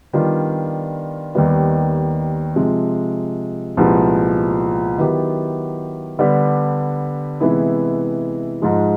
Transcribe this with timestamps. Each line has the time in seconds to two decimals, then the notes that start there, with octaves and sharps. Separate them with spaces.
0.13 D#3 G3 B3 D4 F4
1.35 D#2 D#3 G3 B3
2.56 C3 F3 G#3
3.77 C2 A#2 F3 G#3 B3
4.98 D#3 F#3 B3 E4 G4
6.19 D3 G3 B3 D4 G4
7.40 C3 E3 G#3 B3 E4
8.62 G#2 F3 G#3